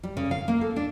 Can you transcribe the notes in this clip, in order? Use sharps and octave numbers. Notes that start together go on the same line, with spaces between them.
G3
C#3
F5
A#3
A4
D4